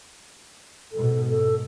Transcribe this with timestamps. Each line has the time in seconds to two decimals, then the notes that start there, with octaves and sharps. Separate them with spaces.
0.92 G#2 B2 A4
1.29 A4